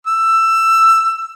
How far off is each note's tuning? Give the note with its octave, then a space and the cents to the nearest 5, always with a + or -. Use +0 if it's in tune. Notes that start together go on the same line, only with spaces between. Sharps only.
E6 +15